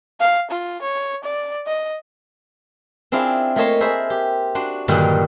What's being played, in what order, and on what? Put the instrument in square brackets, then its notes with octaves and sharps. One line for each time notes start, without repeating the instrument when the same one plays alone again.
[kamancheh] F5
F4
C#5
D5
D#5
[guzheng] C4 D4 E4 F4 G#4
A3 A#3 C#5 D#5 A5 C6
G#4 A#4 C5 E5 B5
G4
D4 F#4 C6
G2 A#2 D3 D#3 F#3 G3